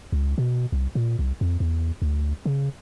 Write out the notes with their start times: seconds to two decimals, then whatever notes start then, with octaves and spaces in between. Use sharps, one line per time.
0.12 C#2
0.38 B2
0.72 C2
0.95 A#2
1.19 C2
1.41 F2
1.60 E2
2.02 D2
2.45 C#3